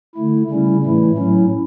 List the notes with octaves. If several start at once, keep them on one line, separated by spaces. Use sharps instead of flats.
D3 A3 E4
C#3 G3 C#4 E4
A2 E3 A3 E4
A2 F#3 C#4 E4